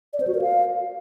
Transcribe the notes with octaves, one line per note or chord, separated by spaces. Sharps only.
D5
C5
F#4
A#4
F5